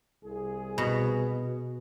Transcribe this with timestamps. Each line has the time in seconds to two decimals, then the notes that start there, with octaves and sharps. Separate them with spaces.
0.24 C2 G#4
0.78 B2